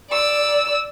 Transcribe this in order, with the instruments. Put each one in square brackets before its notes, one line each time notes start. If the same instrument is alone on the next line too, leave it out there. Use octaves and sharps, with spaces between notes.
[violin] D5 E6